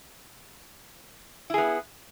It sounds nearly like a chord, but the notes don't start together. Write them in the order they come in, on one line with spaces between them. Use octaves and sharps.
E4 G#4 B3